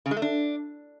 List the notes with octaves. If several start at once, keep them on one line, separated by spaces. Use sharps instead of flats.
C#3
G#3
A3
D4